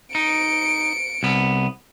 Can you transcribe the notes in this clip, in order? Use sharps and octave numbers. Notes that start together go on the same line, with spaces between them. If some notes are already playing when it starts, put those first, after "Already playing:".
D#4 C#7 D7
C2 B3